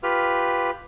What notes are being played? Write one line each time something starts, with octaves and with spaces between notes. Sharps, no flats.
F4 G4 B4 F6